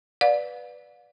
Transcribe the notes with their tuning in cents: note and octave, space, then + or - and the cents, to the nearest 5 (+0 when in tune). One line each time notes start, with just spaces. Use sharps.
B4 +0 D5 +0 F5 +35